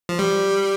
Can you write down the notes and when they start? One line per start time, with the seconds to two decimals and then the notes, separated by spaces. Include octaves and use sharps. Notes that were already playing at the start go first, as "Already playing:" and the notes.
0.09 F3
0.19 G3